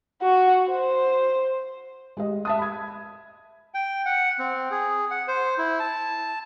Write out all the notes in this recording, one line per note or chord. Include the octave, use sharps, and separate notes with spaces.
F#4
C5
G#3 G4 D#5
E5 A5 D#6
B5 G#6
G5
F#5
C4
G#4
F#5
C5
E4
A5